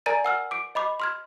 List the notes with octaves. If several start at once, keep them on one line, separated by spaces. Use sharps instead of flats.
A#4 D5 G#5 A#5 A6 D#7
F#5 E6 F6
D6 D7
D#5 B5 D6
C6 F6 G#6